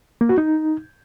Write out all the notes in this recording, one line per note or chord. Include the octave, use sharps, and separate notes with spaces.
A#3
F#4
D#4